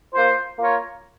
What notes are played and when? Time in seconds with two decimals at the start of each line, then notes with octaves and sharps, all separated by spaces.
0.14 A#3 F4 C5
0.59 A#3 F4 A#4 C#5